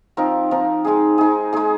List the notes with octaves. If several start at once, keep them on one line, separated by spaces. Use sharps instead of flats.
F3 C4 D#4 A#4
F3 C4 D#4 A#4
G#3 D#4 G#4
G#3 D#4 G#4
G#3 D#4 G#4